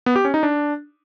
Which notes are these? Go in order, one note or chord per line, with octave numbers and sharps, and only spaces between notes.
B3
G4
C#4
D#4
D4